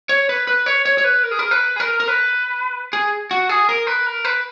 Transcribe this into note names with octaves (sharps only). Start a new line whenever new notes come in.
C#5
B4
B4
C#5
C#5
C#5
B4
A#4
G#4
A#4
B4
G#4
A#4
A#4
B4
G#4
F#4
G#4
A#4
B4
A#4
B4